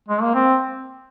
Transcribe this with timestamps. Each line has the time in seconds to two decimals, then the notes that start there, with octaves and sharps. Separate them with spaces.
0.09 G#3
0.22 A#3
0.35 C4